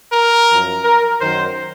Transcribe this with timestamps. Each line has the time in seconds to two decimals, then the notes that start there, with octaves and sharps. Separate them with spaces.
0.13 A#4
0.49 F#2 F3
0.84 A#4
1.20 F#2 D#3 F#3 C5